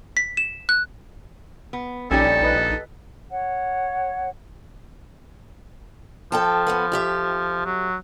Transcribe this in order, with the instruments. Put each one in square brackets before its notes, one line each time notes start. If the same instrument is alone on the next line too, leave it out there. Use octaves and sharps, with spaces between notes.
[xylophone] B6
E7
F#6
[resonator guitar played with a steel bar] B3
[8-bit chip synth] A#1 D#4 [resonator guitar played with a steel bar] G3 C#4 [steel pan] G4 G#5 E6 [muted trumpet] A4
[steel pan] B4 D#5
[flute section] C#5 F#5
[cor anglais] F3 [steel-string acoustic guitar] A4 G5 A5
[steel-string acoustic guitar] B3 A4 B4
F2 G4 E5
[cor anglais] F#3